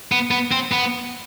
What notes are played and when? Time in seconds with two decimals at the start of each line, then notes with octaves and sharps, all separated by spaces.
0.12 B3
0.31 B3
0.52 C4
0.72 B3